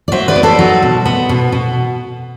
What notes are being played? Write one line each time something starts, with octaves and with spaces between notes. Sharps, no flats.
D5
F#3 C5 E5
B4 D5
B3
A4 C5
F#3
B2
B3
B2
B2